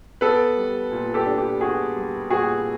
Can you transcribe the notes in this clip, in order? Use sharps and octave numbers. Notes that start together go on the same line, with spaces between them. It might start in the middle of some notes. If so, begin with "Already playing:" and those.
B3 A4 B4
G3
A#2
G4 A4
D4
G4
B3 F#4 G#4
G3
A#2 F#4 G#4